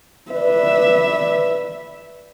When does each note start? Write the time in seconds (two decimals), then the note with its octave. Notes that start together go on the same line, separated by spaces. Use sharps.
0.32 B4 D5 E5